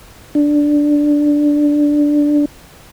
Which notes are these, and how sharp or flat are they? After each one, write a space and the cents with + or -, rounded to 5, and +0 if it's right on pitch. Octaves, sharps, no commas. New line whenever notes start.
D4 +0